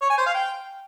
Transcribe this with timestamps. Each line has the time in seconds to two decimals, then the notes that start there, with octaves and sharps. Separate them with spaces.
0.02 C#5
0.10 G#5
0.18 C5
0.26 F5
0.34 G5